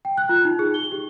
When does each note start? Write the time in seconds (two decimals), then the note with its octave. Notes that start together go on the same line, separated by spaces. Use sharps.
0.05 G5
0.17 F#6
0.29 F4
0.45 D#4
0.59 G#4
0.74 G7
0.92 G4